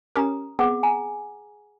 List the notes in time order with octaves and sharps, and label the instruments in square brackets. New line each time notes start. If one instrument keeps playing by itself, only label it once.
[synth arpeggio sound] C#4 G4 A#4 [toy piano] A#5 D#6
[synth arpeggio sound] B3 C4 [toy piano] G#4 F#5 D6
[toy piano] G#5 A#5